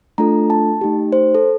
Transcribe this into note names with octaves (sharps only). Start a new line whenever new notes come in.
A3 D4 F4 A4 A#5
A5
A3 D#4 G4
C5
A4